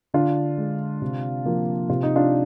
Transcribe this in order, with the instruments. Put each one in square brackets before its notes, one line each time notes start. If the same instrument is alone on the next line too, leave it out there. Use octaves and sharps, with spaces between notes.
[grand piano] D3 D4 F4
G#3
C3
F3 A#3
C3 F4
D#4
D4 F4